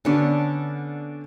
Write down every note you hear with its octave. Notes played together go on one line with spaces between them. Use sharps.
D3 B3 C#4 D4